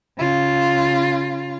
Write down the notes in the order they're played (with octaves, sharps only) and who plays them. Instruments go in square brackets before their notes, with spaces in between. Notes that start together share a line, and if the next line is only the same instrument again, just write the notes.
[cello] C#3 F4